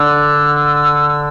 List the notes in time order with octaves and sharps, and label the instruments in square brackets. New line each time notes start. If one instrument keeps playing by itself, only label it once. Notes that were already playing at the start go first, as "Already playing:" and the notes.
Already playing: [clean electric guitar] D3 [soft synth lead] E6
[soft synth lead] E6